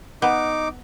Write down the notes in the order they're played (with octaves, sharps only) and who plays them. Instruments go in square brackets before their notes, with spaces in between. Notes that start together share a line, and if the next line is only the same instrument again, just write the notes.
[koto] B3 [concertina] D#4 D6